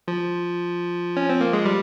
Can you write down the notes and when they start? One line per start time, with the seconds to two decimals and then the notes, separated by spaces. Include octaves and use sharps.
0.08 F3
1.17 C#4
1.29 C4
1.41 A#3
1.53 G#3
1.65 G3